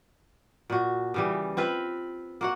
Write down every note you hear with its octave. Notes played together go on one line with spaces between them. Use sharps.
A#2 F#4
C#3 E3 G3
C4 F4 B4
A#3 F#4 F#5